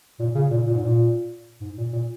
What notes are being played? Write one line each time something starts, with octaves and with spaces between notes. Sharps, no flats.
A#2
C#3
A#2
A#2
G#2
A#2
G#2
A#2
A#2